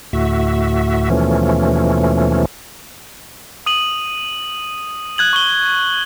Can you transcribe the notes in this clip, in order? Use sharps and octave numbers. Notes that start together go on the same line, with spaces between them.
D2 A2 F#4 E5
D#2 B2 E3 F3 A3 C#4
D#6 D#7 F#7
F#6 G#6 F#7
C#6 G7